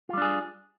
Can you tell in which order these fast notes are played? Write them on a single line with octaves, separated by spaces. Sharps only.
F4 G3 D4 G#4